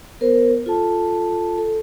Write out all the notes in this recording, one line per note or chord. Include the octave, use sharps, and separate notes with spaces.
B3 A#4 C5
F4 A4 A5
A4